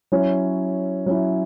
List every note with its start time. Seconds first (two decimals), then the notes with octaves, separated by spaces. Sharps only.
0.12 F#3 C#4 E4
1.06 F#3 C#4 E4